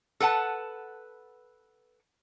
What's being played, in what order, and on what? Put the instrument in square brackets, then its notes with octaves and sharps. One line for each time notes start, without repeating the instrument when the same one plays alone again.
[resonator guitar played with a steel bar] A4 B4 F#5 A5